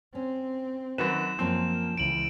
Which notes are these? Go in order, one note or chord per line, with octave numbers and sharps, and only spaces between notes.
C4 C#4
F#2 D#3 F#4 B4 E7
F#2 F3 A#3 C4 C#4
C#2 E3 D7 F#7